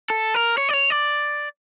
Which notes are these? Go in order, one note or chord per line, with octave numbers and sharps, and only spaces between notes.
A4
A#4
C#5
D5
C#5
D5